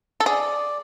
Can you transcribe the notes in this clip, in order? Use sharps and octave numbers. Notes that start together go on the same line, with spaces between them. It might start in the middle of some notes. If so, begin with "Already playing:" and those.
A4
G#4 D5